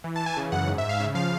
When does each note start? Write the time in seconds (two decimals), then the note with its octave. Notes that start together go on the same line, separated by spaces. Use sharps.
0.04 E3
0.16 A5
0.20 E3
0.26 G#5
0.37 C#3
0.52 F#2 F#5
0.68 G#2
0.78 E5
0.83 G#2
0.89 F5
1.00 C#3 E5
1.15 F3 F5